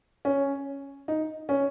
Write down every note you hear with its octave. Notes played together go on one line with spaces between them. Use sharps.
C#4
D#4
C#4